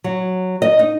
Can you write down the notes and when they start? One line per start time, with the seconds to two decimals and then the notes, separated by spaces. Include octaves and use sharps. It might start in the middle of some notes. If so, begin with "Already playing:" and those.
0.04 F#3
0.62 D#5
0.79 D#4